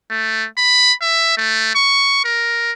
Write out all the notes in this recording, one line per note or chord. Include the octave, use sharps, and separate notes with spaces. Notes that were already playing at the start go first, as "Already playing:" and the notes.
A3
B5
E5
A3
C#6
A#4